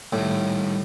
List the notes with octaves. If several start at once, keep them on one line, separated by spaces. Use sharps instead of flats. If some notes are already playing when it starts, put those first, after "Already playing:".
A2 D#3 G3